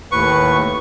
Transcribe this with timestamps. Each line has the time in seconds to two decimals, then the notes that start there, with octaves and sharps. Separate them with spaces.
0.12 D#2 A2 B4 C#6